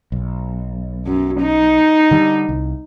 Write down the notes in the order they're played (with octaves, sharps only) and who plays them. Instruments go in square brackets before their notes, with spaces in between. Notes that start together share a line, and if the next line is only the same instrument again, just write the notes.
[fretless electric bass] B1
[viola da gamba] F#2
D#4
[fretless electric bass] D3 G3
C2